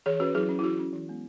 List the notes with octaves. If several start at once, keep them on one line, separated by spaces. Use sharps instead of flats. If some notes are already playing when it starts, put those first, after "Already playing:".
E3 G#4 C#5
C#4 F#4 B4
F#3 E4 G#4
C#4
E4
E3 F#4
C#4
E3
G#3 B3